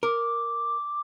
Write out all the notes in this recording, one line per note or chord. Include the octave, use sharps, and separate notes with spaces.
A#4 D6